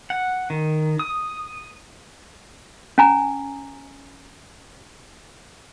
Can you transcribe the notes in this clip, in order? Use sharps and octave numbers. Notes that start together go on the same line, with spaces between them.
F#5
D#3
D#6
C#4 G#5 A#5